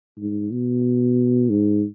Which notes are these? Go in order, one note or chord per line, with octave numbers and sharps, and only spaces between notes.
G#2
B2
G#2